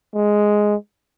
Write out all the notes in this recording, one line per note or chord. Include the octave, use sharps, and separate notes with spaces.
G#3